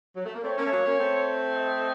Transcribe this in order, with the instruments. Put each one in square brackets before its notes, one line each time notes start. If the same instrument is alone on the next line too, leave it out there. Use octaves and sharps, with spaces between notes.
[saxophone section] F#3
A3
A#3
[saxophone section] A3 C4 [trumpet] C#5
[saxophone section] A#3 C#4
A3
F#3 A#3
A#3 C#4
A3 C4
[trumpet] D#5